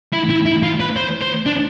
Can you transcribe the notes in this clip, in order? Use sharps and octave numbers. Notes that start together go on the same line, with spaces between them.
E4
E4
E4
F4
B4
C5
C5
D4